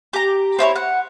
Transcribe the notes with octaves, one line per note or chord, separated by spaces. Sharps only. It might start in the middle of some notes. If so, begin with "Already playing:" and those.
G4 A#5
C4 E4 C5 C#5
F#5